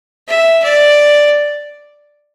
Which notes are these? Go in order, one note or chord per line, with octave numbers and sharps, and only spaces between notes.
E5
D5